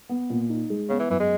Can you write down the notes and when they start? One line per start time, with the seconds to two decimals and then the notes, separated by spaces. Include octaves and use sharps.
0.09 B3
0.30 A#2
0.50 D#4
0.70 G#3
0.89 C#3 B3
0.99 E3
1.10 F#2 E3
1.20 G#3